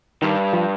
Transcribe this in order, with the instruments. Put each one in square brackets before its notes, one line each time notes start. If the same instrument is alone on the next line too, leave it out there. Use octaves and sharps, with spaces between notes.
[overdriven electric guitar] G2 [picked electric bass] D#3
[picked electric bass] F3